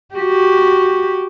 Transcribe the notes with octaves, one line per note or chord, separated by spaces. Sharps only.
F#4 G4